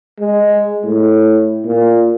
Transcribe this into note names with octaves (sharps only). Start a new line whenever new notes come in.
G#3
A2
A#2